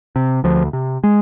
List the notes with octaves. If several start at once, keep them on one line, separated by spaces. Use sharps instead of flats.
C3
D2 F3
C3
G#3